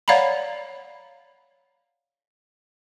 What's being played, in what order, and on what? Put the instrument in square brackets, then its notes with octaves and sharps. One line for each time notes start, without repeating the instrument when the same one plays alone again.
[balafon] C#5 D5 F5 F#5 A#5 B5